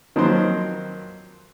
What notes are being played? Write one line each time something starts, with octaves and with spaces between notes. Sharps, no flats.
D#3 F3 F#3 A#3 C4 C5